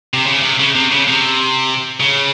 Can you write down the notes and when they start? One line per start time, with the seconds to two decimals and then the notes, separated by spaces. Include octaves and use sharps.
0.14 C3
0.26 C#3
0.41 C3
0.60 C#3
0.75 C3
0.91 C#3
1.07 C3
2.00 C#3